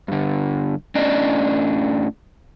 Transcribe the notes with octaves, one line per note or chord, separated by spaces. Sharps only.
G2 D3
A2 C#4 D4 D5 D#5